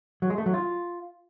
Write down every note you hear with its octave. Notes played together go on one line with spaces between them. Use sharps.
F#3
G#3
A3
F#3
F4